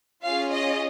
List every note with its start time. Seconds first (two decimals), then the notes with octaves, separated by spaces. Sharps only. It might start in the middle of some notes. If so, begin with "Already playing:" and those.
0.24 C#4 F4 G#4 F5
0.52 D#5